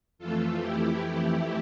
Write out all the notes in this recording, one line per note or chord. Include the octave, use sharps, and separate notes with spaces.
F2 E3 A3 F4 A4
F2 E3 A3 E4 G4